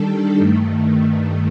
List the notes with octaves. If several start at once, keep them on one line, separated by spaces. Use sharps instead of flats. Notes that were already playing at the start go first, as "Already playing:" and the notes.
Already playing: D#3 G3 D4 A4
G2 D#3 A3